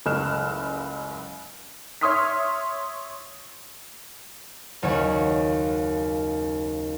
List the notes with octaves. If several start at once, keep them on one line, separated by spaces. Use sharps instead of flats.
F#1 C#2 A3 F6 F#6 E7
C#5 E5 C6 D#6 F6 B6
F#1 D#2 C#5 F#5